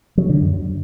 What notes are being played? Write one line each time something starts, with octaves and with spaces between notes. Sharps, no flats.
F#3
D3
F#2